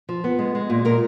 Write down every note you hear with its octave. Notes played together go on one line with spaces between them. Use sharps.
F3
B3
G#3
G#3
A#2
A#2 A#4